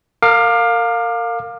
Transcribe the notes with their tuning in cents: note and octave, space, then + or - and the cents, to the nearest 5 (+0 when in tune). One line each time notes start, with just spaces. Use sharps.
A#4 -30 F5 +15 D6 +25